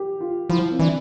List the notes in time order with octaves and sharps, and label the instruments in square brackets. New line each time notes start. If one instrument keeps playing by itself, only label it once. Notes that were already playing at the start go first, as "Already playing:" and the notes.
Already playing: [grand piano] G4
F4
[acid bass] F3 [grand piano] E4
[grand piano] C4
[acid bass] E3 [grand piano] D4